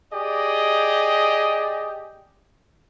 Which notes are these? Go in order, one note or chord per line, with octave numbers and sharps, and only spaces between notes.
G4 G#4 D5 D#5